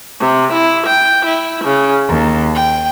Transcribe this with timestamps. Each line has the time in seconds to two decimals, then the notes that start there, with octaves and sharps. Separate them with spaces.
0.20 C3
0.52 E4
0.86 G5
1.26 E4
1.64 C#3
2.08 D#2
2.54 G5